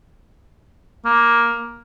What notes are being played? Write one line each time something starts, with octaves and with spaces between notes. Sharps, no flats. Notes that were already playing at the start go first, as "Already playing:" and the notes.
A#3